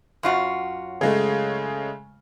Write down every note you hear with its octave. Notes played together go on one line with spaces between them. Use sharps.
F#2 F4 F#4
C#3 G#3 A3